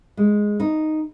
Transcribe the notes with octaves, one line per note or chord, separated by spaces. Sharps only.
G#3
D#4